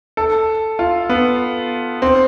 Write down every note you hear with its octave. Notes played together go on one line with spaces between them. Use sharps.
A4
F4
B3
C4